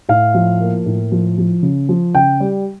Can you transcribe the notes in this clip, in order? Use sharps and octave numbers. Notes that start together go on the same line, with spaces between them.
A2 F5
F3
A#3
A2
F3
F3
C#3
F3
C#3 G5
G3